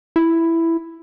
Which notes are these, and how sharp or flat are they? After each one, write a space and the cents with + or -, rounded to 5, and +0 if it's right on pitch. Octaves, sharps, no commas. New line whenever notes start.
E4 +5